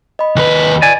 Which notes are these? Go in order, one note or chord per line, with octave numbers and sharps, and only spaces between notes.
D#5 B5
D#2 B4
D5 G#5